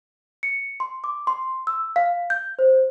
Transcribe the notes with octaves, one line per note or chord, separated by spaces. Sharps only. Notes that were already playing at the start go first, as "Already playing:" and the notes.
C#7
C6
D6
C6
E6
F5
G6
C5